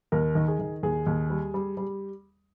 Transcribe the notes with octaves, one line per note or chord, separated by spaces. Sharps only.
D#2 A#4
D#3
G#4
D#3
D#2 G#4
D#2
G3
G3
G3